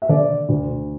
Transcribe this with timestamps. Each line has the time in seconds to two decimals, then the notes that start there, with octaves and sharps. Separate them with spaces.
0.02 E5
0.09 D3 D5
0.49 D2